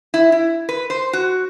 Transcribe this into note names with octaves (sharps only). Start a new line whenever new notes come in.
E4
E4
B4
C5
F#4